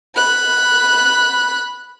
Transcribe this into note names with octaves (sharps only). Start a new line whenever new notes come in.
B5 F#6